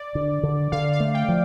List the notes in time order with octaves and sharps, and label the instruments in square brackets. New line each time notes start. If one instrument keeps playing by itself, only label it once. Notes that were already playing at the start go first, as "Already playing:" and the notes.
Already playing: [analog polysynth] D5
[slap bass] D3
D3
[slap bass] D3 [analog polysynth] F5
[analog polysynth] F5
[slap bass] A3
[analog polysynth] G5
[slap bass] F3